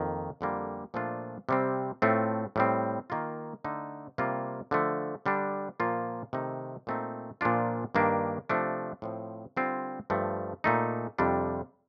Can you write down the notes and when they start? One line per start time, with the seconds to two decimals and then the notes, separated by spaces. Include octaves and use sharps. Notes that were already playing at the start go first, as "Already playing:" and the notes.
Already playing: F2 D#3 A#3
0.41 F2 D3 G3 A#3
0.94 A#2 F3 A3 D4 F4
1.49 C3 G3 C4
2.02 A2 A3 C4 F4
2.56 A2 G3 C4
3.10 D#3 A#3 F4
3.64 D3 A3 D#4
4.18 C3 G3 A#3 F4
4.71 D3 F3 A3
5.26 D3 G3 D4
5.80 A#2 F3 A#3 F4
6.33 C3 D#3 A3 D#4
6.87 A#2 A3 C4 D#4
7.41 A#2 F3 A#3 D4 F4
7.95 G2 D#3 A#3 D4
8.49 C3 F3 A3 D4
9.02 A2 F3 C4
9.56 D3 G3 C4 F4
10.10 G2 F3 A3
10.64 A#2 A3 D#4
11.18 F2 C3 G3 D4